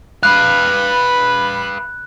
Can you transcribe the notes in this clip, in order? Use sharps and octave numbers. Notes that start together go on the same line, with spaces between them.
B4 F5 B5 F#6